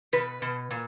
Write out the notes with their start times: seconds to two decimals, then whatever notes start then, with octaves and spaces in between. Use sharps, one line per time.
0.13 B2 B4
0.42 B2
0.71 A#2